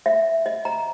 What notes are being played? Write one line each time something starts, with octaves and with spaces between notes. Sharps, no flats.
E5
D#5
A#5